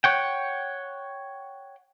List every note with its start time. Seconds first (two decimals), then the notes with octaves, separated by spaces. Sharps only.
0.04 C#5 F#5 G5